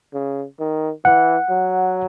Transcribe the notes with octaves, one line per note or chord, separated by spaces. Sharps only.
C#3
D#3
E3 F#5
F#3